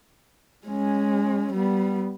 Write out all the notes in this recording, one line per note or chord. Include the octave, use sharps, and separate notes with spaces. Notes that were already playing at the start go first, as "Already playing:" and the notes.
G#3 C#4
G3 B3